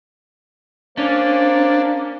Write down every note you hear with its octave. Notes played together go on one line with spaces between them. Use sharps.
A#3 C#4 D4 C5